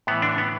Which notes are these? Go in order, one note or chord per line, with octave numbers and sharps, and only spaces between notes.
A2 E3 B3
D3 D4
B3